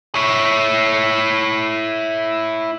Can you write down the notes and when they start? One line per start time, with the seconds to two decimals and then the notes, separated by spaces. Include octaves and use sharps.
0.15 E4 C#5